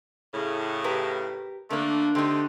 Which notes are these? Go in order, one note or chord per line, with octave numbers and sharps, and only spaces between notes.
A2 C#3
G4 A#4 B4
D3 A3 A#3 D4
D3 A3 C4 D#4 G4